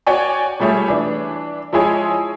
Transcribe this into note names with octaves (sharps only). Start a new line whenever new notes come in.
F#4 C#5 D5 G5 G#5 C#6
F3 G3 A3 G#4 C#5
E3 D4
F3 G#3 E4 G#4 C#5